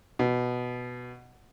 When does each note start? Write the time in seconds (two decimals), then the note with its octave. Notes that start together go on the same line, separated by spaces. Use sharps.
0.19 B2